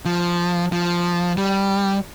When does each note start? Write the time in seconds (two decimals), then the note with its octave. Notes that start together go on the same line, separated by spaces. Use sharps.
0.05 F3
0.72 F3
1.37 G3